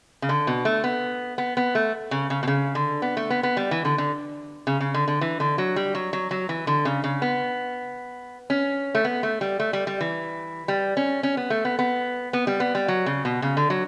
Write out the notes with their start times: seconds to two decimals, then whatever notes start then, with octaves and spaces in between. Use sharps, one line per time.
0.22 C#3
0.29 D3
0.47 B2
0.65 A3
0.84 B3
1.38 B3
1.57 B3
1.75 A3
2.11 C#3
2.30 C#3
2.43 B2
2.47 C#3
2.75 D3
3.02 B3
3.17 A3
3.30 B3
3.43 B3
3.57 G3
3.71 E3
3.85 D3
3.98 D3
4.67 C#3
4.80 C#3
4.94 D3
5.08 D3
5.21 E3
5.40 D3
5.58 F#3
5.76 G3
5.95 F#3
6.13 F#3
6.31 F#3
6.49 E3
6.67 D3
6.85 C#3
7.04 C#3
7.22 B3
8.50 C#4
8.95 A3
9.04 B3
9.23 A3
9.41 G3
9.60 A3
9.73 G3
9.87 G3
10.01 E3
10.68 G3
10.97 C#4
11.23 C#4
11.37 B3
11.50 A3
11.65 B3
11.79 B3
12.33 B3
12.47 G3
12.60 B3
12.75 G3
12.88 F#3
13.06 C#3
13.25 B2
13.42 C#3
13.57 D3
13.70 F#3